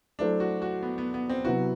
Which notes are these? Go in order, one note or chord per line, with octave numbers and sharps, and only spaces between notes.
F#3 A3 D4 E4 A4 C5
F#4
F#4
B3
B3
B3
C4
C3 F#3 B3 E4 F#4